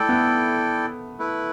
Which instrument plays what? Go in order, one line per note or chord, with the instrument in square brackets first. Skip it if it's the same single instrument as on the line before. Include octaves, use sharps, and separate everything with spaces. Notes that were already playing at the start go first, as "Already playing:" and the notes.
Already playing: [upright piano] A3 [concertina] E4 A4 D5 G5
[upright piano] B3
[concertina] A3 E4 B4